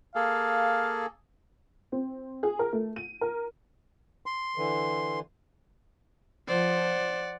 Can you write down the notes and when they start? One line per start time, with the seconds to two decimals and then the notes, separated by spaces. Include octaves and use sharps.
0.15 A#3 G#4 A4 F5
1.92 C4
2.43 G#4
2.59 A#4
2.73 A3
2.96 D#7
3.21 A#4
4.26 C6
4.56 D3 E3
6.48 F3 C5 D5 F#5